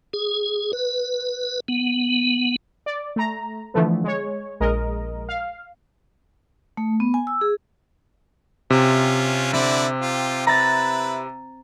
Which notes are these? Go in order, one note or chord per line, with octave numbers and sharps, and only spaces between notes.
G#4
B4
B3
D5
A3 A#5
D3 E3 F3 A3 B3
G#3 C#5
A#1 G#3 A#4 D#5
F5
A3
B3
G#5
E6
G#4
C3 C#4 F4
D3 C4 E4 D5
F4 G4
E4 B4 A#5 A6